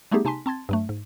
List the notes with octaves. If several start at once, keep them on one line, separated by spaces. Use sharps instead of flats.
G3 A3 B3 D#4 G4 G#4
C3 D#4 G#5 A5 C6 B6
C4 A5 C6 G#6 A6
G2 F#3 A3
G#2